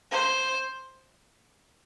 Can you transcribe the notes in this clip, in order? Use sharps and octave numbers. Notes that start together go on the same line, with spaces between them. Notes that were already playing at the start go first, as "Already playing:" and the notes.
C5